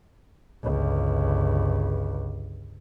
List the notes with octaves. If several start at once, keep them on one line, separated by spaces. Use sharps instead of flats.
G1 C#2